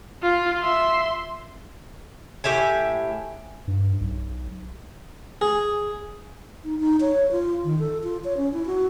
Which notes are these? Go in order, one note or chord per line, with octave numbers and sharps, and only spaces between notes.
F4 F5
E5 C6
A2 G4 E5 G#5
G2
B1
G#4
D#4
D#4
C#5
F4
D#3
A4
F4
C#5
C#4
E4
F#4